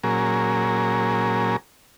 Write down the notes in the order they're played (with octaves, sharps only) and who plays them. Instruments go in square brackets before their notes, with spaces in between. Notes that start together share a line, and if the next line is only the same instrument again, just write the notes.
[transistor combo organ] A#2 F#3 C#4 G#4 A#4